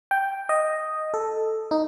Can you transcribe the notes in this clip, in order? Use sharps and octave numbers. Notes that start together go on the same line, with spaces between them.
G5
D#5
A4
D#4